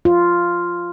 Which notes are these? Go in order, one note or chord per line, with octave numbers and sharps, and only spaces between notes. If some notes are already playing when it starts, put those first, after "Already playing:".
F4